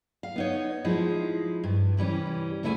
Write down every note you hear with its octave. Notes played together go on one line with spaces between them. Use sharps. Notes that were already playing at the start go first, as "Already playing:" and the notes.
F5
B3 D#4 C#5
F3 G#3 D#4 E4
G2
C3 E3 G3 C#4
D2 C#3 A3 E4 G5 G#5